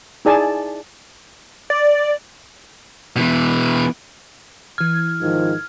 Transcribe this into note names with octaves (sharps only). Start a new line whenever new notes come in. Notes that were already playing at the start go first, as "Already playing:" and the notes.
D#4 E4 G#4 D5 G#5 A5
D5
B2 E3
E3 F6 G#6
G#2 D#3 F3